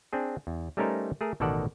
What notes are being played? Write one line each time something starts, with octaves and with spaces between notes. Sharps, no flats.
C4 D4 G#4
E2
G3 A3 C#4 D#4 A#4 C5
A3 G#4 A#4
A1 B2 D#3 A4 D5 F#5